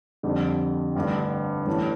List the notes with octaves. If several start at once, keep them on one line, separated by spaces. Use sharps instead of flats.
F2 D3 G3
A1 G2 D3
G2 E3 A3 C#4